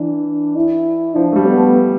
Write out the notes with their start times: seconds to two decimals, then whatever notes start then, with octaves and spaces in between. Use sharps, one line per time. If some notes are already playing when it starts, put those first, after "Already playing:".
Already playing: E3 D4
0.56 E4
1.16 F3 D4
1.32 A3
1.36 G3
1.46 B3
1.56 A3